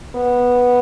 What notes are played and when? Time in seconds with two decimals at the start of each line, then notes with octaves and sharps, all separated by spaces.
0.15 B3